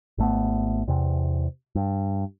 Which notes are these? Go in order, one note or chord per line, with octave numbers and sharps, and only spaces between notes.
G#1 A3 B3
E2 C3
G2